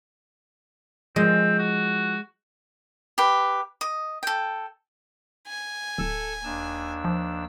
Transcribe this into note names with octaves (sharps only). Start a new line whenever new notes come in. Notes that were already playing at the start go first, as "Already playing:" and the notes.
F3 G#3 C4
F#4
G4 B4
D#5
A4 G5
G#5
D1 A4 E6
D#2 D4 E6
F3